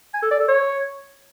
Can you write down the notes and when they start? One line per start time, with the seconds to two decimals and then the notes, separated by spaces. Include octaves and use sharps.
0.14 G#5
0.22 A4
0.31 D5
0.39 A4
0.48 C#5